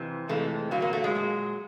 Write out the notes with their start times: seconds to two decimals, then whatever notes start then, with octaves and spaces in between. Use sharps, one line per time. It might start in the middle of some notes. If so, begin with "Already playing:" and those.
Already playing: F2 C3 E3
0.29 F2 C3 E3 G#3 A3
0.71 F#3 A#3
0.76 A#2
0.82 A#3
0.93 A3
1.04 G#3
1.15 A#2 F#3